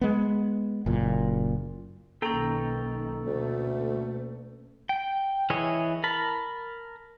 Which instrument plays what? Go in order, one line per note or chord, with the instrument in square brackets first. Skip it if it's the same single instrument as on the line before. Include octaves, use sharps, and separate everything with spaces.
[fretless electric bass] G#3 B3
F#1 A#2
[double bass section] B1 D#3 [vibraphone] A#3 C#4 [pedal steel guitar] A4 G5 A#5
[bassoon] D2 [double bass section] B2 A3
[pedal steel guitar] G5
E3 E4 G#4 C#5 D#5
A#4 A5 B5